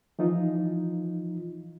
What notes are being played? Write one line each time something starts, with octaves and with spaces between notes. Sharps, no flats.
E3 F3 D#4 F4